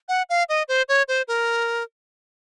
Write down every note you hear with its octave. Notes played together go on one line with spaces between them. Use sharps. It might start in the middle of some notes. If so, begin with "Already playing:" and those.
F#5
F5
D#5
C5
C#5
C5
A#4